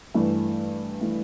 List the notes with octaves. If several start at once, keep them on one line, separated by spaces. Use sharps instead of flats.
G2 E3 A3
E3 A3